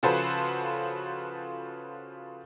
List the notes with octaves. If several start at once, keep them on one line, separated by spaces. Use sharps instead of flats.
C#3 F3 F#4 A4 B4 C5